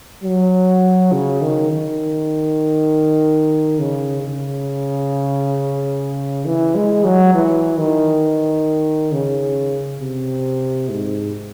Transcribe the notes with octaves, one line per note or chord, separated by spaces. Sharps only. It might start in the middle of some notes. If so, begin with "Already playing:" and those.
F#3
C#3
D#3
D#3
C#3
C#3
E3
G#3
F#3
E3
D#3
C#3
C3
G#2